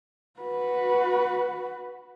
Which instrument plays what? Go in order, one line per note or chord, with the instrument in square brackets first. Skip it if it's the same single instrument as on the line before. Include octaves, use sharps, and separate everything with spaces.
[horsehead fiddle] F#4 B4